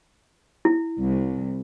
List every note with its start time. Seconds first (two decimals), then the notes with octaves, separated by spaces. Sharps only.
0.65 E4
0.99 C2